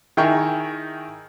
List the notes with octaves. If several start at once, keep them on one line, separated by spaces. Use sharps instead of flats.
D#3 E4 G#4 A#4 G5 C#6